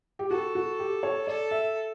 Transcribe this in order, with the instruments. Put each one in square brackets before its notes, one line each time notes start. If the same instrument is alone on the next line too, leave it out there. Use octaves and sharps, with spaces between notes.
[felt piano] G4
[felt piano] F#4 [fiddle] A4
[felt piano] F#4
G4
C#5
[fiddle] A4 [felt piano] D5
[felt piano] E5